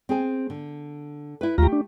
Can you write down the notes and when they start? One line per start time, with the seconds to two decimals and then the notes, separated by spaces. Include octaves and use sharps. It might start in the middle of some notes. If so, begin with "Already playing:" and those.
0.09 C4 G#4 G#5
0.50 D3
1.41 E4 B4
1.58 D#2 A3 F4 G4 A#5
1.72 D4